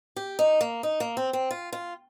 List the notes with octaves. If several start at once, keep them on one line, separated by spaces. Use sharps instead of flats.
G4
D#4
A#3
D#4
A#3
C4
C4
F4
F4